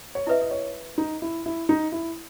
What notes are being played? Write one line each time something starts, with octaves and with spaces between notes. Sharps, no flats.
C#5
E4 B4 D#5 E5
D#5
C#5
D#4
E4
E4
D#4
E4